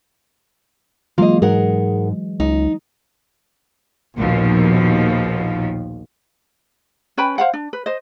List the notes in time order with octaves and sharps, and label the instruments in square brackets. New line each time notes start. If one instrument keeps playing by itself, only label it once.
[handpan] E3 F#3 G#3 [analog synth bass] A#3 [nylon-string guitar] F4 D#5
[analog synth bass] G#2 [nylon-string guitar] G#4 A#4 F#5
[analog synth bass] C#2 [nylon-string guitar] D#4
[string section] A#1 D#2 B2 F3
[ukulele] C#4 B4 G5 B5
C5 F5 F#5
D4
B4
C5 D#5